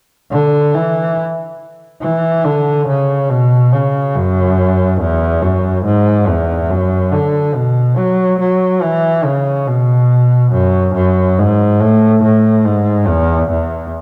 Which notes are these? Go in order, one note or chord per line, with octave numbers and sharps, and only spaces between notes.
D3
E3
E3
D3
C#3
B2
C#3
F#2
E2
F#2
G#2
E2
F#2
D3
B2
F#3
F#3
E3
C#3
B2
F#2
F#2
G#2
A2
A2
G#2
E2
E2